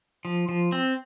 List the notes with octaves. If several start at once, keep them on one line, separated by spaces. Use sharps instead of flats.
F3
F3
C4